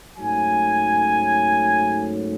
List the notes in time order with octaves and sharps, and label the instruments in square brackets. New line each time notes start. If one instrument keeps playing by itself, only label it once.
[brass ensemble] G#2 F#3 A3 C#4 G#5